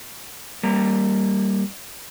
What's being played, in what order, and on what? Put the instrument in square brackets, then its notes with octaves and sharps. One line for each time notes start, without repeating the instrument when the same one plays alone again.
[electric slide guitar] G3 A#3 A#5